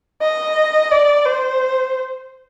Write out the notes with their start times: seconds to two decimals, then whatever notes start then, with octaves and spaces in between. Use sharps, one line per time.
0.22 D#5
0.92 D5
1.26 C5